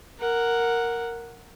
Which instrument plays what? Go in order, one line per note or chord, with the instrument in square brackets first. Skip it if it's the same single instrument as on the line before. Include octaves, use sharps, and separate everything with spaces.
[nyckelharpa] A#4 F#5